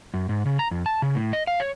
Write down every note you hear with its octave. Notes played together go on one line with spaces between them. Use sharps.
F#2
G#2
C#3
A#5
F2
A5
C#3
A2
D#5
F5
C#5